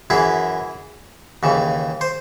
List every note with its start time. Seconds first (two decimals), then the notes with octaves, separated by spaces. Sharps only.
0.10 F#2 E3 E4 G#4
1.43 D#2 C#3 E3
2.01 C5